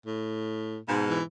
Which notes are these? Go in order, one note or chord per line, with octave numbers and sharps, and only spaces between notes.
A2
G#2 B2
E3